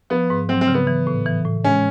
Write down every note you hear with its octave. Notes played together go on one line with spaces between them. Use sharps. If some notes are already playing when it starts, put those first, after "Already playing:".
F3 B3
G#2
F#3 C4
C4
C#3
B3
E3
A2
E3
A2
G#3 C#4